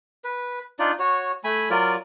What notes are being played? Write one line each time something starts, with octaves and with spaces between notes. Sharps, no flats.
B4
D4 D#4 F4 D5
F#4 C#5
A3 G#5 B5
F#3 F4 A#4 D5